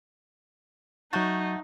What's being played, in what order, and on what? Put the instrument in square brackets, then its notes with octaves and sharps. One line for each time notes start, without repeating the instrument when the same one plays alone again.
[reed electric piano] F#3 G6 A6 [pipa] A3 F#4 A5 [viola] D#4